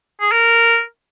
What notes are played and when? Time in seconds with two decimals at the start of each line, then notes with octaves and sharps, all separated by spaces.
0.21 G#4
0.32 A#4